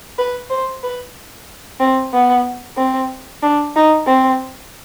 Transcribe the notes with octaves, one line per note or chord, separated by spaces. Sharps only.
B4
C5
B4
C4
B3
C4
D4
D#4
C4